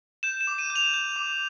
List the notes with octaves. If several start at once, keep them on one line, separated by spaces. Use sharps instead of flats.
G6 E7
E7
D6
D#7
G6
F7
G6
D6